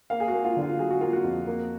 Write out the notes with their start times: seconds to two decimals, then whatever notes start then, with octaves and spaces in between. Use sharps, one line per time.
0.10 A#3 F5
0.20 G#4
0.28 F#4
0.34 A#3
0.44 F4
0.57 D3 F4
0.79 F#3 G#4
0.90 F#4
1.01 A#3 F4
1.13 F#4
1.24 F2
1.47 A#3